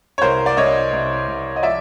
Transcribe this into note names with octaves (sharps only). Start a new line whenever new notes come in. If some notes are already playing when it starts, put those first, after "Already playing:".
C#5
C2 A#4 C5
D5
C2 C#5 D#5
C2
C2
D#5
F3 D5 E5